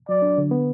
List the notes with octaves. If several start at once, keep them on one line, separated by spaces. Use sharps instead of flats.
F#3 D5
D4
D3
B3